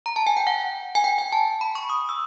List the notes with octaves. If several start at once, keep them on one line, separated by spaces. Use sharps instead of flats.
A#5
A5
G#5
G5
F#5
G#5
G5
G#5
A5
B5
C#6
D#6
E6